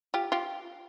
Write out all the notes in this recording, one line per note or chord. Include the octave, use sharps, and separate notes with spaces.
F4 G4
F4 G4